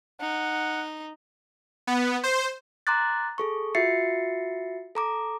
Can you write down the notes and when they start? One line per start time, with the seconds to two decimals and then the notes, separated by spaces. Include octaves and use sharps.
0.21 D#4 F#5
1.87 B3
2.23 C5
2.87 A#5 C6 D6 F#6 A6
3.38 G#4 A4 C#6
3.75 F4 F#4 E5 A6 C7 C#7
4.95 A4 A#5 D6